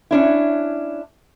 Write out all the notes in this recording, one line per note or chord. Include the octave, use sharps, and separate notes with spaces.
C#4 D4 E4